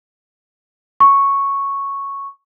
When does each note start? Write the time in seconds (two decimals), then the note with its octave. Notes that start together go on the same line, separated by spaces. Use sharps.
1.00 C#6